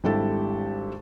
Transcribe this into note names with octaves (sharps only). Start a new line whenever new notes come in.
G#1 G3 D4 E4 G4 A4